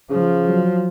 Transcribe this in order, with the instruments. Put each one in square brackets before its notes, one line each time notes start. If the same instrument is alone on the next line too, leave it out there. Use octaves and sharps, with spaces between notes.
[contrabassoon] C#3 [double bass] F3
[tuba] F#3